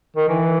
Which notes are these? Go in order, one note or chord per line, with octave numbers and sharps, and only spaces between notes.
D#3
E3